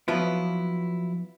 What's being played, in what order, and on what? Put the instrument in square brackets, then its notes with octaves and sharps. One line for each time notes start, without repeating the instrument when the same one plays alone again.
[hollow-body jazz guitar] F3 F#3 B3 E4 F4